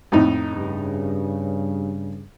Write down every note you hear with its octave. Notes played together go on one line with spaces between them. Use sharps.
F2 A2 D#4
G2 C#3